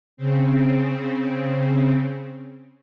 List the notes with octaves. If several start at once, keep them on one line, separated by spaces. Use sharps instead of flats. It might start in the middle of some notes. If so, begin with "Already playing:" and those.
C#3 C4